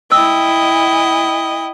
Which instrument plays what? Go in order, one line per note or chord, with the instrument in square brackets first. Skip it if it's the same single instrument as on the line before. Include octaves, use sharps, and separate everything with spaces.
[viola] E4 D#5 [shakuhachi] G5 [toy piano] E6